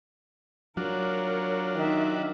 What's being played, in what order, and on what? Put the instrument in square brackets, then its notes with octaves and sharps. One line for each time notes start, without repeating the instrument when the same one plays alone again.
[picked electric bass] F#3 [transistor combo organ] D4 F4 F#4 [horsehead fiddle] A#4 C#5
[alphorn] D#3 [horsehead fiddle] D#4 E5